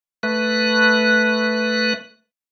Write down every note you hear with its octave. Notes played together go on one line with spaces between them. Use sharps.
A3 B4 F#6